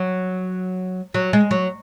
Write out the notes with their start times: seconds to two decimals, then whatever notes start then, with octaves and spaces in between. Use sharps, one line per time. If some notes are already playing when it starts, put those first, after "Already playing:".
Already playing: F#3
1.14 F#3
1.33 G#3
1.51 F#3